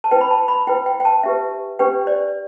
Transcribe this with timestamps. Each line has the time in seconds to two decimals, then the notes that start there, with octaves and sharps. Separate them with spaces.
0.04 A5
0.11 E4 B4 G5
0.21 B5
0.31 A5
0.48 B5
0.67 E4 B4 G5
0.86 G5
1.00 G5
1.05 A5
1.23 D4 G4 B4 E5
1.79 D4 G4 B4 G5
2.07 D5